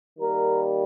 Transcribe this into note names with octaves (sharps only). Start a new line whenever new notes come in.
D#3 G3 A#3 A#4